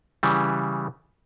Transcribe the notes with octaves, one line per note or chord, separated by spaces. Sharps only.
C#3 E3 G3